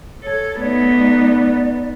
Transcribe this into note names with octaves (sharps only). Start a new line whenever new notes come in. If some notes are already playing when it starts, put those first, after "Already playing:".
A4 C#5
A3 B3 D#4 D5